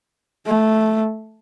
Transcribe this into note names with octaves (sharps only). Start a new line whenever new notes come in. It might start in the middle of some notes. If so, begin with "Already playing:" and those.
A3